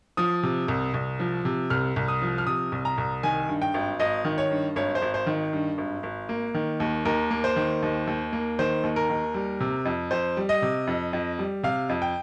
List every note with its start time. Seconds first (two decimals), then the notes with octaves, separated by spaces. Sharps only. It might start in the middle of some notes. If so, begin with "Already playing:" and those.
0.17 F3 D#6
0.43 C3
0.68 C2
0.94 C2
1.19 F3
1.45 C3
1.70 C2 F6
1.96 C2
2.08 D#6
2.22 F3
2.38 F6
2.47 C3 D#6
2.72 C2
2.85 A#5
2.98 C2
3.23 D#3 G#5
3.49 G2
3.62 G5
3.74 G#1
4.00 G#1 D#5
4.25 D#3
4.38 C#5
4.51 G2
4.76 G#1 C#5
4.95 C5
5.02 G#1
5.14 C5
5.27 D#3
5.53 G2
5.78 G#1
6.03 G#1
6.29 A#3
6.54 D#3
6.80 D#2
7.05 D#2 A#4
7.31 A#3
7.44 C5
7.56 D#3
7.82 D#2
8.07 D#2
8.33 A#3
8.59 D#3 C5
8.83 D#2
8.96 A#4
9.10 D#2
9.34 G3
9.60 C3
9.85 F2
10.11 F2 C5
10.37 G3
10.49 D#5
10.62 C3
10.87 F2
11.13 F2
11.39 G3
11.63 C3 F5
11.89 F2
12.02 G5